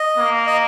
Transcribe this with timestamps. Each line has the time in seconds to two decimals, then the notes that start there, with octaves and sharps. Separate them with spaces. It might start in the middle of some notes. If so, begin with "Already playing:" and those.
Already playing: D#5
0.18 A#3
0.47 D#5